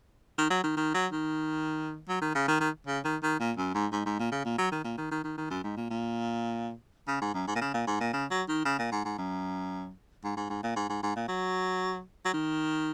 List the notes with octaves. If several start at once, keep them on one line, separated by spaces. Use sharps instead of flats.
D#3
F#3
D#3
D#3
F#3
D#3
F#3
D#3
C#3
D#3
D#3
C#3
D#3
D#3
A#2
F#2
G#2
G#2
G#2
A#2
C#3
A#2
F#3
D#3
A#2
D#3
D#3
D#3
D#3
F#2
G#2
A#2
A#2
C#3
G#2
F#2
G#2
A#2
C#3
A#2
G#2
A#2
C#3
F#3
D#3
C#3
A#2
G#2
G#2
F#2
G#2
G#2
G#2
A#2
G#2
G#2
G#2
A#2
F#3
F#3
D#3